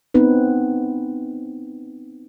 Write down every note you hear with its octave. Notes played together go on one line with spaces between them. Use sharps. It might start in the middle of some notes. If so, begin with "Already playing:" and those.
B3 C4 D#4 B4